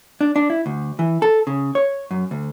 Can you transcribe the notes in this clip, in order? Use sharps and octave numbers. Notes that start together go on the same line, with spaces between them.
D4
D4
E4
D2
E3
A4
C#3
C#5
F#2
D2